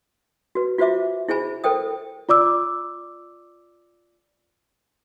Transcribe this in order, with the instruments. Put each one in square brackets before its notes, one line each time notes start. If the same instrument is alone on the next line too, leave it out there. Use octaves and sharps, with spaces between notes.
[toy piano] F#4 B4
F4 F#4 C5 E5 D6
E4 G#4 C5 G#5 B5
A4 A#4 C5 G5 D#6
[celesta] F4 D5 D6 E6